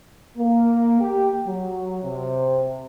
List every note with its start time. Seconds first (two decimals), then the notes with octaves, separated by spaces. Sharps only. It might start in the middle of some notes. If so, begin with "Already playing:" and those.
0.38 A#3
1.01 G4
1.47 F#3
2.04 C3